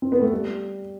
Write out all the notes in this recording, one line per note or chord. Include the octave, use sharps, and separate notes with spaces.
C4
B3
A3
G3